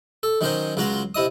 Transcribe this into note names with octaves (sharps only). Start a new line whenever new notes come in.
A4
D#3 F#3 C#4 D#4 A#4 C5
C#2 F#3 F4 F#4 A#5 C6
C3 E4 D#5 D#6